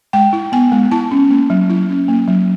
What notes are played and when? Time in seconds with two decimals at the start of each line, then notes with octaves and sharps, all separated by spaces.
0.13 G#3 G5
0.33 E4
0.52 B3 G#5
0.72 G#3
0.91 E4 A5
1.11 C#4
1.30 A#3
1.50 F#3
1.70 E4
1.89 C#4
2.08 A#3
2.28 F#3